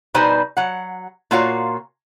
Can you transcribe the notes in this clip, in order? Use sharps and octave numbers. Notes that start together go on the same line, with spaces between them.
B2 G3 D#4 B4 C5 G#5
F#3 F#5
A#2 A#3 F4 F#4 C#5 F5